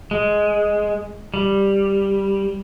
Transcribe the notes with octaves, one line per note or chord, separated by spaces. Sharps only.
G#3
G3